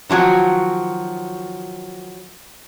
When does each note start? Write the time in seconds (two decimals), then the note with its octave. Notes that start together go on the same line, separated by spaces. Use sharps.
0.09 D#3 F3 F#3 F#4